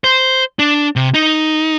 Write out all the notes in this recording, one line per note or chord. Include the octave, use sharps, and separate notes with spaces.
C5
D4
C3
D#4